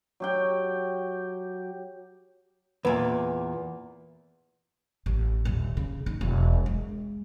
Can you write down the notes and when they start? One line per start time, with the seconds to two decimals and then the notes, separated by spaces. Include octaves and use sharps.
0.20 F#3 G4 G5
2.85 E2 A#2 B4
5.06 A1
5.45 D#1
5.77 C#3
6.06 D#4
6.21 E1
6.66 G#3